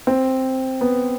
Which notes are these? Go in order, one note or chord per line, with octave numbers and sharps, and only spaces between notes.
C4
B3